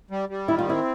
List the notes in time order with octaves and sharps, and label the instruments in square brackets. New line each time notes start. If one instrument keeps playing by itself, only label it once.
[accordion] G3
G3
[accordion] D#3 [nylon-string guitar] E4
[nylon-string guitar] F4
[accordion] C4 [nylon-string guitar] E4